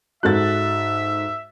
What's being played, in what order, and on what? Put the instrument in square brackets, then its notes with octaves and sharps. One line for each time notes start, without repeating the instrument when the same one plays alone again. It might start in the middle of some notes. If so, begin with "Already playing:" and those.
[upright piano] G#2 F#6 [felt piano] F#4 A4 A6 [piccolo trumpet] E5